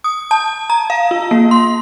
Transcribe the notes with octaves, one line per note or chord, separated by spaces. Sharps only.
D#6
A5
A#5
F5
F4
A#3
C6